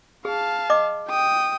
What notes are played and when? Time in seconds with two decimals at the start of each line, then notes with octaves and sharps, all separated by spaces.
0.25 G#4 F5 A5
0.70 D#5 D6
1.09 G5 D#6